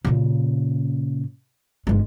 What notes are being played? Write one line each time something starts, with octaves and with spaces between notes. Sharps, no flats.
A#2 C#3
G1 G#3